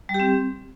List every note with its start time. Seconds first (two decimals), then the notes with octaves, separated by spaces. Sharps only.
0.09 G3
0.14 G4
0.20 C4